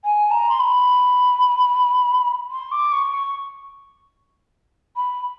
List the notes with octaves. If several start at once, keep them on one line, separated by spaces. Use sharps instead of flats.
G#5
A#5
C6
B5
C6
D6
C#6
C#6
B5